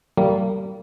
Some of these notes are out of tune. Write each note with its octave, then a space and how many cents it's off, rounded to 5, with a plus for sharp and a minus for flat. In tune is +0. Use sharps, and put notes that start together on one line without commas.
G3 -30 A#3 -40